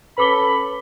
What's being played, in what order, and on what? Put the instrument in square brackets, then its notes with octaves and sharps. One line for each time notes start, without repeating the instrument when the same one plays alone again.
[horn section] C#4 A4 B5 [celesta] B4 D6 G7